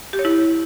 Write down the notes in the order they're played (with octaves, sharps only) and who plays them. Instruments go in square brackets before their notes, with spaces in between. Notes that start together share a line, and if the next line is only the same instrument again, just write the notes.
[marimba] G4
C#5
E4